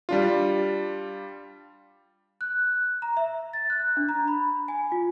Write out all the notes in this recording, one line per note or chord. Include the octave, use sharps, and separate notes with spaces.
G3 D4 F4
F#6
A#5
E5
A6
F#6
D4
A#5
B5
G#5
F4